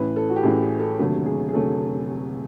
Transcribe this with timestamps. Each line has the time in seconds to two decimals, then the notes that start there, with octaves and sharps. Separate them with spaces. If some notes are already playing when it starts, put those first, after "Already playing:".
Already playing: A1 A2 E3 B4
0.16 A4
0.30 F#4
0.36 G4
0.43 A1 A2 E3 G#4
0.62 G#4
0.80 A4
0.99 F1 D#2 D3 F#3 A3
1.26 G#4
1.48 G#4
1.53 F1 D3 F#3 A3 A4